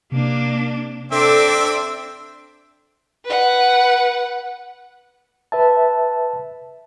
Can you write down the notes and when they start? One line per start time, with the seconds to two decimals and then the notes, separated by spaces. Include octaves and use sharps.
0.12 C3 A#3 D4
1.12 C4 D4 A4 D5 E5
3.25 B4 F#5
5.52 B4 E5 A5